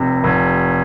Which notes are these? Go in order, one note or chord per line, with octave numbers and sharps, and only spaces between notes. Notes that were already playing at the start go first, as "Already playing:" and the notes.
Already playing: F1 C3
F1